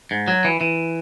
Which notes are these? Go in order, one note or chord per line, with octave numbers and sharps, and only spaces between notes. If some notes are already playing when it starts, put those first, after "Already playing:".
G#2
F#3
E3
E3